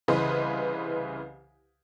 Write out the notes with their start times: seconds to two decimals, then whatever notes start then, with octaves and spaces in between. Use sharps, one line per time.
0.08 C2 C#3 E3 B4 C5 D#5